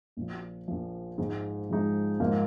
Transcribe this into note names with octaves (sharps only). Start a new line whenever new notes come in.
A#1 A#2 F3
A#1 A#2 F3
G#2 F3 G#3 D#4
G#2 F3 G#3 D#4
G#2 F3 A#3